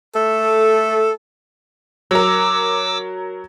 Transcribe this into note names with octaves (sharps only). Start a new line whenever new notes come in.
A3 A4
F#3 A#4 D6 E6